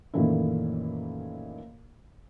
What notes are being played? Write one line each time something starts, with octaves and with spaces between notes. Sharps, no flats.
F#2 A#2 D#3 E3 A3 E4